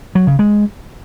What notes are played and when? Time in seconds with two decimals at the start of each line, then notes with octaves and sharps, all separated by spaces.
0.15 F#3
0.27 C#3
0.39 G#3